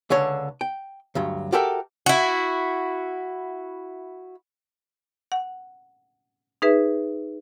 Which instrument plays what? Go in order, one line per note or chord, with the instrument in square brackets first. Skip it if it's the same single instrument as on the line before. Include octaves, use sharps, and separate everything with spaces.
[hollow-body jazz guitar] C#2 D3 D4 C#5
G5
D2 G2 F#3
F#4 G4 A4 A#4 E5 G5
[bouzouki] E4 F#4
[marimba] F#5
D#4 G#4 B4 E5